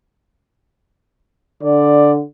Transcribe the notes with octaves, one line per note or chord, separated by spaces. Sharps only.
D3 D5